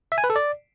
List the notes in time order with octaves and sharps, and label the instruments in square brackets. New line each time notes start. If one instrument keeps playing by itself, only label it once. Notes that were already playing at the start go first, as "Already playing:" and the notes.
[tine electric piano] E5
G#5
B4
A4
D5